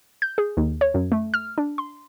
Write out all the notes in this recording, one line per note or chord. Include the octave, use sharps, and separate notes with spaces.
G6
G#4
D#2
C#5
F#2
A3
F6
D4
C6